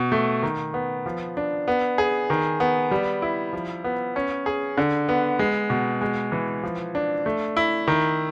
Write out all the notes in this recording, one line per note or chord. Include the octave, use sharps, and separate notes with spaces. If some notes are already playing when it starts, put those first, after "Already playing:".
Already playing: B2
A3
D#3
B3
F3
D4
B3
G#4
D#3
B3
G3
E4
F3
B3
C#4
G#4
D3
B3
G#3
B2
G#3
E3
F3
D4
A3
E4
D#3